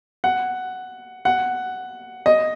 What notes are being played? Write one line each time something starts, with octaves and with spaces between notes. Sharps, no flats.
F#5
F#5
D#5